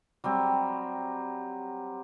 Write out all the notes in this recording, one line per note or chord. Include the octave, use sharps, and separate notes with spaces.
F#3 G3 C4